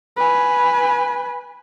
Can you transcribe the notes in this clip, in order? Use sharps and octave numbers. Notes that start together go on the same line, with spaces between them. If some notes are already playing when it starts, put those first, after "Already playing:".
B4 G#5